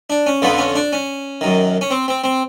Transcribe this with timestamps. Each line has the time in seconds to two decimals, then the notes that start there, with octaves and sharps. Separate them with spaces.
0.10 D4
0.26 C#4
0.42 F2 D3 F3 B3
0.58 C#4
0.76 D4
0.93 C#4
1.41 F#2 D#3
1.81 C#4
1.91 C4
2.08 C4
2.24 C4